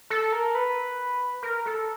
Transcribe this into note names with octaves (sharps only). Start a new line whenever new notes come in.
A4
A#4
B4
A#4
A4